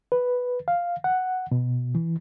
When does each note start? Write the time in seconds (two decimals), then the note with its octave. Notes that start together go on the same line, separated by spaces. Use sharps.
0.12 B4
0.68 F5
1.04 F#5
1.52 B2
1.95 E3